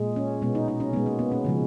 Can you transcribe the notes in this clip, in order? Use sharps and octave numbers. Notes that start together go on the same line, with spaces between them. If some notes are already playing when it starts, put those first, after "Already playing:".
Already playing: A#2 G#3
C#4
B2 G#3 B3
D#4
D#4
C#4
B2 G#3 B3
A#3
B3
C#4
C#3 F3 G#3